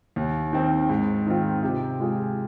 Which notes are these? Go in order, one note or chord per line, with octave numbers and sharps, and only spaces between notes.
D#2
D#3 C4
G#2
D#3 C4 F4
C3
G#3 F4 G#4